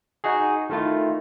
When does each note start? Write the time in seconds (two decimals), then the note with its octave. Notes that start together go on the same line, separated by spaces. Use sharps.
0.24 D#4 F#4 G#4
0.70 D#3 A3 E4 F4